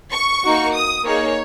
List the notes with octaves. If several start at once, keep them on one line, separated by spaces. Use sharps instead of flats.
C#6
A#3 D#4 F#4
D#6
A#3 D#4 G#4 C#5